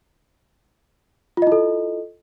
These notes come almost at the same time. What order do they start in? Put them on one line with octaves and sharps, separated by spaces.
F4 D#5 E4 A4